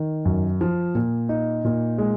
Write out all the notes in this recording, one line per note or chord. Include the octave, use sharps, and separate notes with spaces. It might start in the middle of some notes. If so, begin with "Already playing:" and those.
Already playing: D#3
F#2
F3
A#2
D#4
A#2
G#3